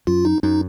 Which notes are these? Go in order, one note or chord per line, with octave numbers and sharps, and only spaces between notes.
F#2 F4
D#4
F#2 D#4